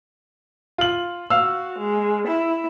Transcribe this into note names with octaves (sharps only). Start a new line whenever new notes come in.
F4 F#7
F#4 F5 E6
G#3
E4